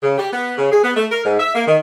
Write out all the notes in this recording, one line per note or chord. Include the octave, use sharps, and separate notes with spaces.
C#3
G4
B3
C#3
G#4
B3
A3
A#4
G#2
E5
A#3
D#3